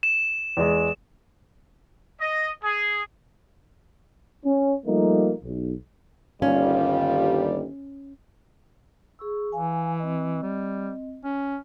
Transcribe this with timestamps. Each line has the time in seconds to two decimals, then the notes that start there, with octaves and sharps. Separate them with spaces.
0.03 E7
0.57 E2 G#3
2.21 D#5
2.64 G#4
4.45 C#4
4.86 F3 G3 A3 A#3 D#4
5.43 B1
6.42 G1 D#2 G3 C#4 F4
9.19 G#4 C#6 E6
9.52 E3 F5 G#5
10.00 C4 D#5
10.43 G3
11.25 C#4